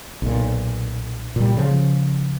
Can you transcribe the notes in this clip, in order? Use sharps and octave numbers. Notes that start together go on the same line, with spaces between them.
B1 A#2
A#2 G3
C#3 F3